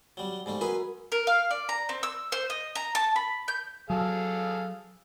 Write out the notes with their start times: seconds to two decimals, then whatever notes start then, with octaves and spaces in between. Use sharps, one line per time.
0.17 F#3 G3
0.46 G#2 G3 A3
0.61 F#4 G#4 A#4 B4 G#5
1.12 A#4
1.27 F5
1.51 D5
1.69 A#5
1.89 C4
2.03 E6
2.32 C5
2.50 D#5
2.75 A#5
2.95 A5
3.16 B5
3.48 G6
3.90 F#3 G#4 A4 F5